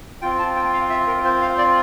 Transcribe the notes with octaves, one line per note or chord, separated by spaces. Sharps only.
C4 F4 G5
A5
G5
F5
E5
A#4
C5
F5
D5